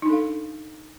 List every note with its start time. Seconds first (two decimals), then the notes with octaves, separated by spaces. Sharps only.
0.02 D#4
0.06 D4
0.09 A4
0.13 F5